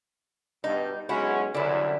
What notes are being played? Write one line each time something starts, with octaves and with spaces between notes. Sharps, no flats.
G2 B2 D#4
B1 G#3 C#4 E4 F#4
C2 F#2 D3 E4